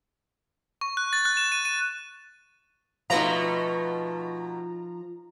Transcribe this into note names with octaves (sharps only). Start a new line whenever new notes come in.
C#6
F#6
A6
F#6
E7
D#7
D#7
B2 F3 A3 D#4 B4 F5 A#5